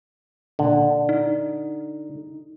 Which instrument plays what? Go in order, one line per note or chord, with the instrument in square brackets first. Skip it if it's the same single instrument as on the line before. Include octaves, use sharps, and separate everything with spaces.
[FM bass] A#2 [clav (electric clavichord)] D3
[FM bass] D#4